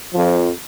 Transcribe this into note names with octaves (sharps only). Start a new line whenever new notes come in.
F2 F3